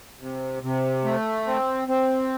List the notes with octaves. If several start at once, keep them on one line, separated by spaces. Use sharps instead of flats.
C3
C3
A3
C4
C4